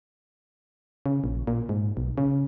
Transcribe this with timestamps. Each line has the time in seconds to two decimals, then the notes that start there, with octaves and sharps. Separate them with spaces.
1.06 C#3
1.24 A#1
1.47 A#2
1.69 G#2
1.97 B1
2.18 C#3